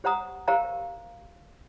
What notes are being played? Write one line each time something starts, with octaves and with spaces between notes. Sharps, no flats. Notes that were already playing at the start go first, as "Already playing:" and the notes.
G4 C5 F#5 A#5 D#6
G4 A#4 C5 F5 A#5